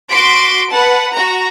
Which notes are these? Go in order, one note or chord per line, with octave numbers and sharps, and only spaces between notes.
F#4 C6 D6 B6 D7
B4 F#5 A5
F#4 A#5